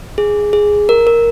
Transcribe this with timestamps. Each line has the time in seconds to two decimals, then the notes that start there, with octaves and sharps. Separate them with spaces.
0.18 G#4
0.53 G#4
0.89 A#4
1.07 A#4